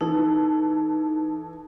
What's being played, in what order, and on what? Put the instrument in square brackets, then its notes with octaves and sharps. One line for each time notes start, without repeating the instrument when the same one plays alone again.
[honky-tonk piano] E3 A4 [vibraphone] D#4